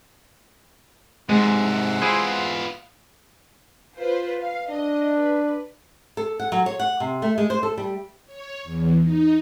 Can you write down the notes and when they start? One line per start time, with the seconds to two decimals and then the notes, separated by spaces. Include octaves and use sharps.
1.29 G#2 C3 G#3 E5 F#5
2.02 B3 E4 F4 G#4 C5
3.97 F4 B4 C5
4.42 F5
4.70 D4 D#5
5.18 B4
6.17 A4
6.40 F#5
6.52 F#3
6.66 C#5
6.79 F#5
7.00 C3
7.22 A3
7.38 G#3
7.50 C5
7.63 A4
7.78 G3
8.26 C#5
8.64 E2
9.00 D#4